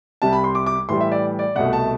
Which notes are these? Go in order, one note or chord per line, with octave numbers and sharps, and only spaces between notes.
C2 C3 G3 A5
B5
C6
D6
D6
A2 E3 G3 C6
E5
D5
D5
C2 B2 A3 F#5
A5